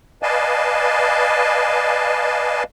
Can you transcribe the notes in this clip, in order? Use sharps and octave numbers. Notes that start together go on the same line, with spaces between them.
B4 D5 D#5 F5 G#5 A5